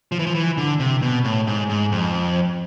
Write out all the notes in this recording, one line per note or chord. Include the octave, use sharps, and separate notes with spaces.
F3
E3
F3
E3
D3
C3
B2
A2
G#2
G#2
F2